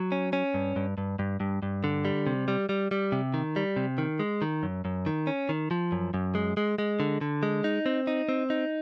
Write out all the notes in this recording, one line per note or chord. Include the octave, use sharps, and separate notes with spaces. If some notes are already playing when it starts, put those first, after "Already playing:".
Already playing: F#3
C#4
C#4
G2
G2
G2
G2
G2
G2
D3
G3
C3
G3
G3
G3
C3
D#3
G3
C3
D#3
G#3
D#3
F#2
F#2
D#3
C#4
D#3
F3
F#2
F#2
G#3
G#3
G#3
D3
D3
G#3
D#4
C4
D#4
C4
D#4